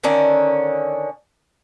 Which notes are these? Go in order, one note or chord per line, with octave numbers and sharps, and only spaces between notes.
D3 D#3 C#4 D5